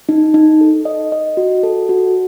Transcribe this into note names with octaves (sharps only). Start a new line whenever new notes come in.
D#4
D#4
A4
D#5
D#5
F#4
A4
F#4